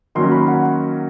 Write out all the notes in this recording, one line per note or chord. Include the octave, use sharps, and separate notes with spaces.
D#3 F#3 A#3 C#4 C6
B5
F#5